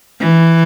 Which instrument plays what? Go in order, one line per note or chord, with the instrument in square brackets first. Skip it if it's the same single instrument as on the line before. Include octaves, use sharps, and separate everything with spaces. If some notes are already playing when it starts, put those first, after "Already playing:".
[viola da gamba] E3